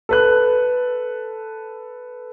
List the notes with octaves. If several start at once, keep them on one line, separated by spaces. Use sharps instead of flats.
A4 B4 F#6